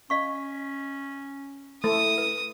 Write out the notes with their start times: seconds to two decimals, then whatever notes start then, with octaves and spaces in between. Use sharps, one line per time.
0.10 C#4 D#5 F5 C#6
1.84 A3 E4 D#6
2.18 B4